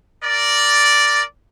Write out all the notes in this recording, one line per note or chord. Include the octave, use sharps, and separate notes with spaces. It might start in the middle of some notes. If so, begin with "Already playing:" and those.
A#4 D5